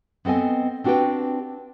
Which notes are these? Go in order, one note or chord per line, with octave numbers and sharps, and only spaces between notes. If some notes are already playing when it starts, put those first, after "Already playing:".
B3 C4 A4 D#5 G#5
C4 D4 F#4 G4 B4 G5